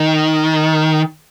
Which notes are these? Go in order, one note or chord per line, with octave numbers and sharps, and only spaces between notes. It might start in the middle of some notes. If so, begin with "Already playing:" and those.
Already playing: D#3